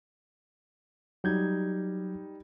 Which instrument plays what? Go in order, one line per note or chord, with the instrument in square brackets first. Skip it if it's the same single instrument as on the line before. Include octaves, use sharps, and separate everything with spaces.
[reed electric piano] F#3 G6 G#6 [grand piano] G3 D#4